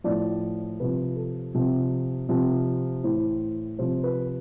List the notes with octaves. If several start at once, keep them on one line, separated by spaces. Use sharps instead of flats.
A2 F3 D5
C3 F3 B4
A4
C3 F3
C3 F3
A2 E3 C5
C3 F3 C5
B4